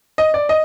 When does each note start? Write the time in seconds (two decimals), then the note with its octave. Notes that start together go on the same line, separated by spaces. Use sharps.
0.18 D#5
0.34 D5
0.49 D#5